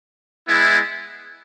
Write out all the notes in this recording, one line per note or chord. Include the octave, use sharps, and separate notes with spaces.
G#3 B3 E4